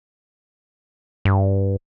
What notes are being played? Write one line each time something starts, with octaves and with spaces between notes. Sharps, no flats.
G2